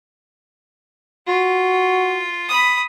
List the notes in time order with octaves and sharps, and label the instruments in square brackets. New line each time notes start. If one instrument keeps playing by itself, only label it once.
[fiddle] F4 [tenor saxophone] F#4
[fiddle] B5 D#6